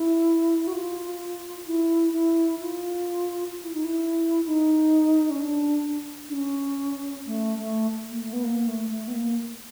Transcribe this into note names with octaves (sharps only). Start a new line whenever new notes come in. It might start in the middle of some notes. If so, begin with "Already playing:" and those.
Already playing: E4
F#4
F4
E4
E4
F4
F4
E4
D#4
E4
D#4
C#4
D4
D4
C#4
A3
A3
A#3
A3
B3
A#3
A3
A3
B3
A#3